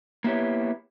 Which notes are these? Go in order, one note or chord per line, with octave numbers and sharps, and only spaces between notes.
A#3 B3 E4 G4 C#5